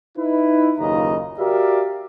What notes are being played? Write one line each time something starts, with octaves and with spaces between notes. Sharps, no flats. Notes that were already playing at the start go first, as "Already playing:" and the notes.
D#4 E4 B4
F#1 D#2 C#3 F4 D#5 A#5
F#4 G4 A#4 D5 E5 F5